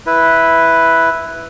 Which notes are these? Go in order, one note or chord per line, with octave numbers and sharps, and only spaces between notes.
E4 B4